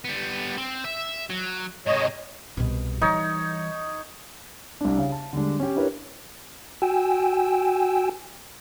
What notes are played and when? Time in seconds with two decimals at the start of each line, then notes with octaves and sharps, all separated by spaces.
0.05 G3 B3
0.58 C4
0.85 E5
1.30 F#3
1.87 G#2 C3 C#5 D#5
2.57 C2 B2
3.02 E3 G3 D#4 C#5
4.81 C2 D4
4.98 C#3
5.12 A5
5.33 D3 G3 G#3 D4
5.60 C#4 G4
5.76 D4 E4 G4 A#4 B4 C#5
6.82 F#4 G5 G#5 E6